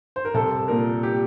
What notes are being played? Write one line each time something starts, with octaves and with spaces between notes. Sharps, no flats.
C5
A#4
C2 A4
A#2 A#4
G4